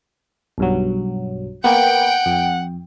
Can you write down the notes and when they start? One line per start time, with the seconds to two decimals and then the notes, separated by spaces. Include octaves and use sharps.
0.58 B1 G2 F#3
1.64 A#3 B3 F#5 G5
2.26 F2